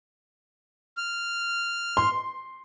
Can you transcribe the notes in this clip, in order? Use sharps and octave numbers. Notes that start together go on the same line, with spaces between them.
F6
C6